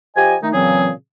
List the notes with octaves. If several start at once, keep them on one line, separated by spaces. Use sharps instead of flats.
F3 G4 D#5 G#5
D#3 A3 D#4
A#2 C#3 E3 F#3 C4 G#4